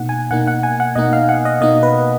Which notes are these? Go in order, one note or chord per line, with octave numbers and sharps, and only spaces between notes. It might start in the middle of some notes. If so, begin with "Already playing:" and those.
Already playing: B2 A#3 D#4 F#5
G#5
B2 A#3 D#4 F#5
F#5
G#5
F#5
B2 A#3 D#4 D#5
F5
F#5
D#5
B2 A#3 D#4 D#5
B4